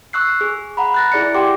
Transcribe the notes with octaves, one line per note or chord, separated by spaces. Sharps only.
C#6 E6 F#6 C7
G#4
F#5 A#5 B5
F#6 A6 A#6
E4 G#4 D5 A#6 C#7
G4 F#5 G5 C6 D6